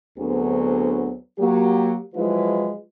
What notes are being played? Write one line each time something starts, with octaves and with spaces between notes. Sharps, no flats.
D2 D3 F#3 B3 C4 G#4
F#3 A#3 G4
F3 F#3 G#3 E4 F4 B4